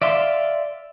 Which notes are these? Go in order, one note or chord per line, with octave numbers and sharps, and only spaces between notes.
D5 E5 F5 C6